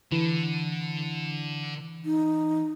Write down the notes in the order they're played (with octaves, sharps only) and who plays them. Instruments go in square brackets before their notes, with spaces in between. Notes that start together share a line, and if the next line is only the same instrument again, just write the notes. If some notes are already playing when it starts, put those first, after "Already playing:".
[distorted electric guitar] D3 [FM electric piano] E3
[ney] D#4